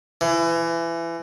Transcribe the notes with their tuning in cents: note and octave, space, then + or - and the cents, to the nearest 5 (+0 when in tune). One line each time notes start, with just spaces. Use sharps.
E3 +25